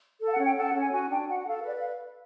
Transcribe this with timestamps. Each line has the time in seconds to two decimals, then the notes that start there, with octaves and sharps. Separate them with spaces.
0.20 A4
0.26 F5
0.31 F#5
0.38 C#4
0.44 G5
0.55 A4 F#5
0.67 F#5
0.74 C#4
0.80 G#5
0.92 F#4 G#5
1.10 D4 G5
1.28 F#4 F#5
1.43 F#5
1.47 A4 F5
1.65 B4 D5
1.79 F5